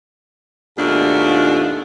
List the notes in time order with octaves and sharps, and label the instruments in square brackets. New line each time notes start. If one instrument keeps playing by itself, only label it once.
[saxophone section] D#2 G#2 B2 A3 D4 F4